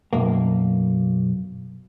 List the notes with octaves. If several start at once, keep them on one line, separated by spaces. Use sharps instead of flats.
B1 F#2 A#3